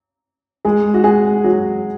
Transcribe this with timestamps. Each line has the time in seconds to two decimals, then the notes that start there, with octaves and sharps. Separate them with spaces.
0.65 G#3 G#4
0.94 F#4
1.04 G#3 G#4
1.44 F#3 F#4